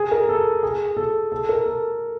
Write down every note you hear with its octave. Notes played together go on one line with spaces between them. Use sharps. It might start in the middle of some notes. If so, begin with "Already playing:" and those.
Already playing: G#4
A#4
A4
G#4
A4
A4
A#4
A4